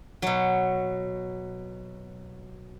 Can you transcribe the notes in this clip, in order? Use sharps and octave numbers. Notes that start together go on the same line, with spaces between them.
B2 F#3